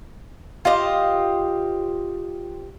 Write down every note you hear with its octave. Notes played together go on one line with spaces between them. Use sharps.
F4 G4 C5 D#5